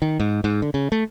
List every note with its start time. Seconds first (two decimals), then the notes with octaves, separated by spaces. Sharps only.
0.02 D#3
0.20 G#2
0.44 G#2
0.62 D3
0.74 C#3
0.92 A3